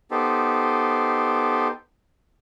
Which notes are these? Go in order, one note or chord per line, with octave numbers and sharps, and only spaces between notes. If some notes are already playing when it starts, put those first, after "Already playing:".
B3 D#4 G4 A4 C5